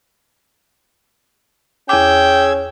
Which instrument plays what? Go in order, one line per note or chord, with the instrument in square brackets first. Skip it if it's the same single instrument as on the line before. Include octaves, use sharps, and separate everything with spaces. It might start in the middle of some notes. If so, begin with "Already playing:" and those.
[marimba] E2 D6 [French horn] C#4 [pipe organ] G#4 E6 G#6 [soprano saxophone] G5